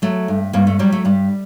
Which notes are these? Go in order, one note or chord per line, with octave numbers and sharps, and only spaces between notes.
F#3 A3
G2
G2 A#3
A3
F#3 G3
A3
G2 G3